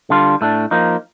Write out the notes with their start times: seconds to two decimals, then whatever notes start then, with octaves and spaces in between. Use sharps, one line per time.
0.10 D3 G3 D4 F4
0.41 A2 A3 D4
0.71 F3 A#3 D#4